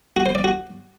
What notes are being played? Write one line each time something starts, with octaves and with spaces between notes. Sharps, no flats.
F#4
C5
D5
F#4